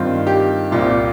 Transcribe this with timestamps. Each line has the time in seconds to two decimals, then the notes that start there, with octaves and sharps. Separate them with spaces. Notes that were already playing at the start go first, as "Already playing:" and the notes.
Already playing: G2 D#3 C4 F4
0.27 G4
0.71 C2 A#2 G3 C4 F4